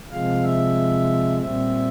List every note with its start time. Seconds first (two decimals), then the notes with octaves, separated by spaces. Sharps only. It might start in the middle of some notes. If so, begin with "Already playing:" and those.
0.11 C3 F3 G#3 F5
0.43 E5
1.40 A#2 G3 C4 E5